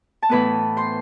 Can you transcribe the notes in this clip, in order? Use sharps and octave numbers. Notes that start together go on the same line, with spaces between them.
A5
A2 E3 B3 B4 B5
C5 C6